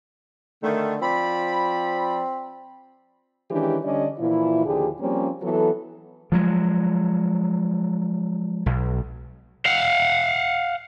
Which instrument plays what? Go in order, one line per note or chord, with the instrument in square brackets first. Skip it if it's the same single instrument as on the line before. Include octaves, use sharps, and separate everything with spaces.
[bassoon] D3 [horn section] D#3 A3
[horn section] F3 D5 B5 [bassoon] C4
[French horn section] D#3 E3 G#3 C#4 D4 G4
D3 G3 C#4 D4 D5 D#5
A#2 E3 F3 E4
D#2 D3 F3 G4 G#4
F3 G3 A#3 C4 C#4
E3 F#3 B3 A4
[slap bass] F3 F#3 G#3
B1
[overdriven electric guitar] F5 F#5